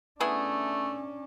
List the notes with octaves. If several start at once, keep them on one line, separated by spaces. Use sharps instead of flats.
A3 B3 C#4 D4 E4 G#4